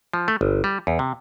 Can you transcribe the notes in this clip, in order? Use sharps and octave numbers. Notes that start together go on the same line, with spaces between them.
F3
A3
G1
G3
E2
C3